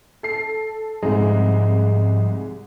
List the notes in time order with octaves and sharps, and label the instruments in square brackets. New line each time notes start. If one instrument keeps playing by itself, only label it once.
[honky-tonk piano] A4 C7
[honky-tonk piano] C2 G#3 [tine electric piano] G#2 F3 D#5